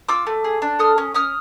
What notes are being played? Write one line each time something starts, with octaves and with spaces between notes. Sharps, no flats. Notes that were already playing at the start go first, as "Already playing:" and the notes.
F4 D6 E6
A3
G#4
D4
A4 D#6 F6
C#4
C#4 D#6 F6